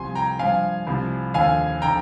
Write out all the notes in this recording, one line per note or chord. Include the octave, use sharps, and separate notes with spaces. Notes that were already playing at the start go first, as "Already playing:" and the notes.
Already playing: C2 C3 F3 G#5 C6
G5 A#5
G2 F3 F5 G#5
C2 C3 F3
D#2 D3 F3 F5 G#5
D3 F3 G5 A#5